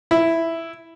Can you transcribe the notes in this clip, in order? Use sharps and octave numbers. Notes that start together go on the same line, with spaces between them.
E4